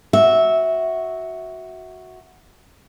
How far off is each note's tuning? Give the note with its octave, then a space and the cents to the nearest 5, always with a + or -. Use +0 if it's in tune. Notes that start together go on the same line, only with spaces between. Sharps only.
F#4 +0 E5 -15